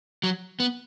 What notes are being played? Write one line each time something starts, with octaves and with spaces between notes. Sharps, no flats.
F#3
B3